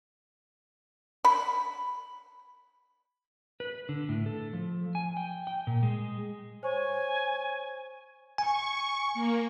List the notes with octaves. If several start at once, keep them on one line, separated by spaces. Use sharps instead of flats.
B5
B4
D3
A2
A4
F3
G#5
G5
G5
A#2
G#3
C5 C#5 G#5 C#6
G#5 C#6
A#3